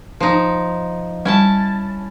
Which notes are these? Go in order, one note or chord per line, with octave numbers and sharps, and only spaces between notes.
F3 D#4
G3 C#4 E4 A5